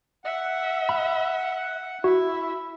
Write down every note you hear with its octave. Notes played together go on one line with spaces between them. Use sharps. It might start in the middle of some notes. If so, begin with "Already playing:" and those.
E5 F#5
B5
E4 F#4 E5